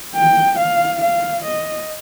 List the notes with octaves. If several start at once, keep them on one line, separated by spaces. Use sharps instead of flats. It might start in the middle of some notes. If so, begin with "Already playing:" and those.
G5
F5
F5
D#5